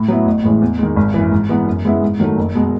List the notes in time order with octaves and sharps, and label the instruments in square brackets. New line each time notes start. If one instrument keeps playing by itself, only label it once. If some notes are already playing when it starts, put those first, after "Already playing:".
Already playing: [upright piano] A2
F#3 B3 E4
A1
A2 E3 G#3 C#4
E2
D#3 G#3
G#1
F#2 E3
G#2
E3 G#3 B3
F#2
C#3 G#3 B3 E4
G#2
D#3 F#3 A3
F#1
B2 G#3